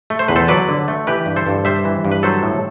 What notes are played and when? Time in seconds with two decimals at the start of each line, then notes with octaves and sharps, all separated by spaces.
0.10 A3
0.19 C5
0.28 E2 B4
0.36 A4 C5
0.48 F#3 B4 D5
0.68 D3
0.88 A3
1.07 E3 G4 B4
1.26 G2
1.36 A4 C5
1.47 G2
1.65 G3 C5 E5
1.85 E3
2.05 G2
2.12 B4
2.23 F#3 A4 C5
2.43 A2